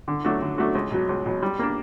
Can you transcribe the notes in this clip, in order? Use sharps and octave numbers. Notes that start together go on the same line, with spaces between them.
D3
F#3 A3 D4 F#4
D3
F#3 A3 D4 F#4
C#2
B2 F#3
C#2
B2 F#3
G3
A#3 D4